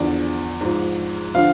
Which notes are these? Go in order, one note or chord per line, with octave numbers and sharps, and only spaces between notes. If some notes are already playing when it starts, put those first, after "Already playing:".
Already playing: E2 D3 F3 D5
G#2 F3
D3 F3 F5